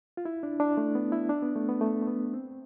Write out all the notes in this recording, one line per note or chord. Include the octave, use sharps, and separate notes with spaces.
F4
E4
D4
D4
A3
B3
E4
D4
B3
A3
B3
A3
A3
B3
C4